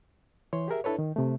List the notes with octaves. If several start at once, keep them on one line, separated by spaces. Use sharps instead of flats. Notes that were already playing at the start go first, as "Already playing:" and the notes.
E3 C#5 C6
G4 G#4 A#4 E5
D4 E4 A4 B4 C#5
D#3
C3 A3